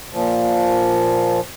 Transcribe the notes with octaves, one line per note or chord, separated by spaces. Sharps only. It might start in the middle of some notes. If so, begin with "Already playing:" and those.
A#2 F3